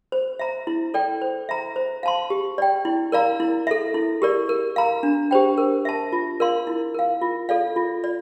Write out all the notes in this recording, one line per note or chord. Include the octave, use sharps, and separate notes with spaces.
C5
E5 A#5
E4
A4 D5 G5
C5
E5 A#5
C5
F5 A5 C6
G4
D5 G5
E4
A#4 D5 F5 A#5
E4
A4 E5
E4
G4 A#4 D5
A#4
F5 A#5
D4
G4 C5 G5
A#4
E5 A5
F4
A#4 D5 F5 C6
E4
A#4 F5
F4
A4 D5 F5
F4
D5